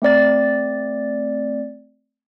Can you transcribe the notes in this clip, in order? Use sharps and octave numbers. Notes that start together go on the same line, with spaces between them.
A3 C4 D5 A6